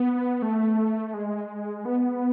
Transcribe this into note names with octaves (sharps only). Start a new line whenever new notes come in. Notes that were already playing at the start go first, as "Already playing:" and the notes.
Already playing: B3
A3
G#3
B3